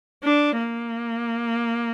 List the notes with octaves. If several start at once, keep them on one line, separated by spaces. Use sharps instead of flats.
D4
A#3